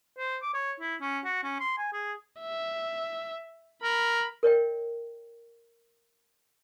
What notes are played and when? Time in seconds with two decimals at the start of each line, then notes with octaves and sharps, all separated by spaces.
0.18 C5
0.42 D6
0.54 C#5
0.80 E4
1.01 C#4
1.25 F#4
1.43 C#4
1.60 C6
1.78 G#5
1.93 G#4
2.40 E5
3.83 A#4 B5
4.43 A#4 C#5 D#5 G5